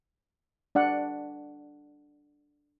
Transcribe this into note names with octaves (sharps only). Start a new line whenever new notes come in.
D4 D5 F#5